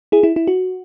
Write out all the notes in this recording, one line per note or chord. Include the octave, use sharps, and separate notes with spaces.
E4 G#4
E4
E4
F#4